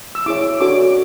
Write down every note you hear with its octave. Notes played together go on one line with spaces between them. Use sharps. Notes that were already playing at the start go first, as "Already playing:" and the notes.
E6
E4 G#4 C#5 D6
D4 F#4 A4 C#5 D6